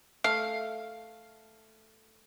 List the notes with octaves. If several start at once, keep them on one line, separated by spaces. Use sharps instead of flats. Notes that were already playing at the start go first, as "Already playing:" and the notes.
A3 F5